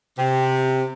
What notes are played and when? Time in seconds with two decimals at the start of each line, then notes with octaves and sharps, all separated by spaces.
0.17 C3